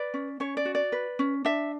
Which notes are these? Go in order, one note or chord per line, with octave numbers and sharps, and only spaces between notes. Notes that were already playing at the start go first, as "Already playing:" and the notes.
Already playing: B4 D5
C#4
C#4 C#5
D5
F#4
D5
B4
C#4
D4 E5